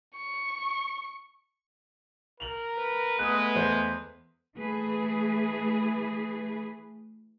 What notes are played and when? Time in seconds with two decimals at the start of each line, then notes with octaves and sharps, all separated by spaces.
0.15 C#6
2.40 A#4 F7 F#7
2.78 B4
3.19 G#3 A3 B3 D#6 F#6
3.55 E2 C5
4.56 E3 A3 G#4 B4